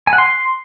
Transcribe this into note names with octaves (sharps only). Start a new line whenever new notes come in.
G#5
F#5
C6